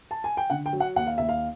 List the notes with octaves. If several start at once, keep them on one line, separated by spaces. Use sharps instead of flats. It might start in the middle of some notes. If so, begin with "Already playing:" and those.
A5
G#5
G5
D3 F#5
G5
F#3
F#5
D#2 F#5
F5
D#2 E5
F5